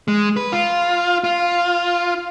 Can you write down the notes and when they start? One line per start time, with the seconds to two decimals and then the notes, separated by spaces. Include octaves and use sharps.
0.08 G#3
0.36 B4
0.52 F4
1.24 F4